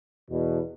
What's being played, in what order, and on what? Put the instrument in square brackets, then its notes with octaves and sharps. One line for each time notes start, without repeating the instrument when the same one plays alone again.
[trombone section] E2 B2